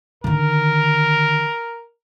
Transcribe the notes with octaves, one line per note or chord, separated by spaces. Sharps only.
D3 D#3 A#4